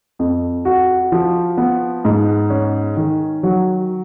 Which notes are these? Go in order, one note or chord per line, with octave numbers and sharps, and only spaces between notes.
F2
F#4
F3
B3
G#2
C#4
D#3
F#3